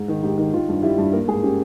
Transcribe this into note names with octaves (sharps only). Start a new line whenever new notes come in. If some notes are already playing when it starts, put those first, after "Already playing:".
Already playing: G#2
D#3
G#2 G4
D#3
D#3 F4
G2
G3 E4
G2
A#3 A#4
G#2 G#4
C#4 G4